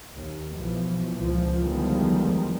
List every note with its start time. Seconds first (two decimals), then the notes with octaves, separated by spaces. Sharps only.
0.16 D#2
0.56 B1 B2 E3 F3
1.17 C#2 A#2 F3
1.60 E2 D3 D#3 F3 G3 G#3